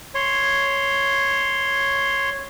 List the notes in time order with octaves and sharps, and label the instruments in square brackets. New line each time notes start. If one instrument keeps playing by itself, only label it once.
[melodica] C#5 C6